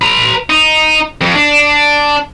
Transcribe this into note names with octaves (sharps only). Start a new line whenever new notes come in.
B4 A#5
D#4
F2
D4